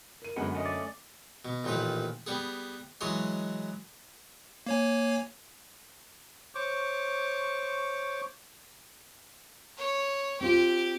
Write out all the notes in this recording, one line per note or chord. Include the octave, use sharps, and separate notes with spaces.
A#4 D#7
F#2 D3 G#3 B3 F#5
A3 C#4 D#5
D5
B2
A1 A#2 D#3 F3 B4
G3 B3 G#4
E3 F#3 G#3 C#5 D#5 C6
A#3 C#5 G#5
C5 C#5 C#6 D6
C#5
C4 F4 G4